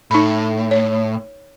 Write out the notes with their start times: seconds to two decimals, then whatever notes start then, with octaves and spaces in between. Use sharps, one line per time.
0.11 A2 D#4 B5
0.71 C#5